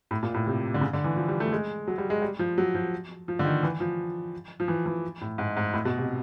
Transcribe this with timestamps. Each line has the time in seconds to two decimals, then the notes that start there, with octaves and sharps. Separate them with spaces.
0.11 A2
0.23 A#2
0.34 A2
0.46 C3
0.74 D3
0.81 C#3
0.93 D3
1.04 E3
1.17 F3
1.28 G3
1.40 A3
1.52 G#3
1.88 F#3
1.98 G3
2.10 G#3
2.22 G3
2.39 F3
2.58 F#3
2.75 F3
3.28 F3
3.39 D3
3.45 D#3
3.63 E3
3.80 F3
4.60 F3
4.68 E3
4.86 E3
5.21 A2
5.38 G#2
5.57 G#2
5.74 A2
5.85 B2
5.98 C3